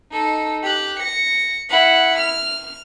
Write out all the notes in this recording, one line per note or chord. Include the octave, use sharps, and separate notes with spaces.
D#4 A4
G4 F#6
A#6 C#7
E4 F#5
F6